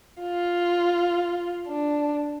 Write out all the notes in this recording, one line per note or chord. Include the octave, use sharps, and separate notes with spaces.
F4
D4